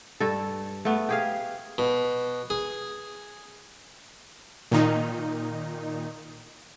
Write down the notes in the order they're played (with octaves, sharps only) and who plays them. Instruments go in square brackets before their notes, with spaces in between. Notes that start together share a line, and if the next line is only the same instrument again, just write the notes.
[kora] G2 A4
A3 B3
G4 G#4 F5
[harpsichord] B2
G#4
[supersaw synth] A#2 D#3 D#4